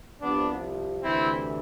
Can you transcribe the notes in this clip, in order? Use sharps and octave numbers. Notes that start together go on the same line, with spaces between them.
C2 C3 F3 B3 D4
D2 C3 E3 C4 E4